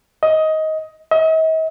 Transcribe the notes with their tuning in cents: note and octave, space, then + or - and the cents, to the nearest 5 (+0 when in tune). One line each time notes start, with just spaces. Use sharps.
D#5 +15
D#5 +45